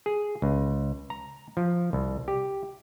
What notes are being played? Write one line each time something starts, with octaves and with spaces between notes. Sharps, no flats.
G#4
C#2
A#5
F3
C2
G4